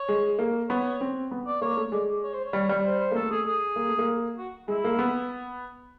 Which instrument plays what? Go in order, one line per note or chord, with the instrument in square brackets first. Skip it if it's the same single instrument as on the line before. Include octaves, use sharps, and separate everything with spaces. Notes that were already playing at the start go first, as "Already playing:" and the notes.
Already playing: [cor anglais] C#5
[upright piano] G#3
A#3
[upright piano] B3 [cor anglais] C#5
[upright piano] C4
B3
[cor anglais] D5
[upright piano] A#3 [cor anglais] C#5
[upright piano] A3
[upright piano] G#3 [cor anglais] D5
[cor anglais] C#5
C5
C#5
[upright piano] G3
G3
[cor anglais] C5
C5
[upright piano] A#3
[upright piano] A3 [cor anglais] A4
[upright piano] A3 [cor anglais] G#4
[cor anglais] G#4
[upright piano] A#3
A3
A#3
[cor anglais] F#4
[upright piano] G#3 [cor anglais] E4
[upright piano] A#3
B3